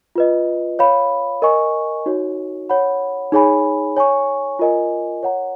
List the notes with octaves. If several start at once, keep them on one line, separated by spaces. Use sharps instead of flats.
F4 B4 D#5
C#5 F5 B5
A#4 D#5 G#5 C#6
D#4 F#4 C#5
C#5 F#5 B5
D#4 G#4 C#5 G#5 B5
C#5 G#5 C#6
F4 A#4 D#5 G#5
C#5 F#5 A#5